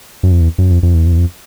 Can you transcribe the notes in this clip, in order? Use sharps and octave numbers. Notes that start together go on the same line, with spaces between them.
F#2
F2
E2
F#2
F2
F2
E2
F2
E2
F2